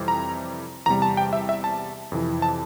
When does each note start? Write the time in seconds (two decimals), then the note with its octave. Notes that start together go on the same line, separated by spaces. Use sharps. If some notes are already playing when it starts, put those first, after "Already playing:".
Already playing: F2 C3 E3 G3
0.08 A#5
0.86 E2 C3 G3 A#5
1.02 A5
1.17 G5
1.33 E5
1.49 E5
1.64 A5
2.12 F2 C3 E3
2.42 A5